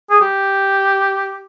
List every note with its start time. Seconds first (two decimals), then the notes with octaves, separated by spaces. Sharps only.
0.10 G#4
0.21 G4